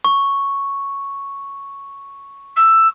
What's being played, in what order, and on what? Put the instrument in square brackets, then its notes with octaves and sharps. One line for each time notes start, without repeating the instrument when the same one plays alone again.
[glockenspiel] C#6
[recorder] E6